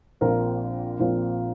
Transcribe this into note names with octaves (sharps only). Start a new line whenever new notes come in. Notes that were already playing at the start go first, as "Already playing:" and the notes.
A#1 A#2 F3 C4 A#4
A#1 A#2 F3 C4